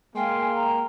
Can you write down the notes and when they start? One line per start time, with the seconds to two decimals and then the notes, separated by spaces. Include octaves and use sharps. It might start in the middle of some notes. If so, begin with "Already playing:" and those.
0.16 G#3 A#3 F5 G5 G#5 C6
0.56 A#5